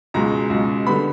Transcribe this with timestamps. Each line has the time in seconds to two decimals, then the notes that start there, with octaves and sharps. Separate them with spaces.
0.14 C#2 B2 G#3 A#5
0.50 C#2 B2 G#3
0.86 D3 G3 B3 B5